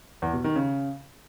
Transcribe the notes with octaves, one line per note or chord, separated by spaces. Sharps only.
E2
B2
D#3
C#3